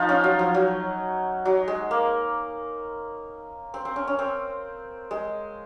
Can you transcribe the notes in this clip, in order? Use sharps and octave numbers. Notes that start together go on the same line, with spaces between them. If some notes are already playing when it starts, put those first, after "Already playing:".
Already playing: F3 D#4 F4
C#4
F#3
F3
F#3
F#3
G#3
A#3
C4
C4
C#4
C#4
C4
G#3